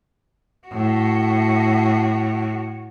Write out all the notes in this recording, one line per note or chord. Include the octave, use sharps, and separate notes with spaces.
A2 F#4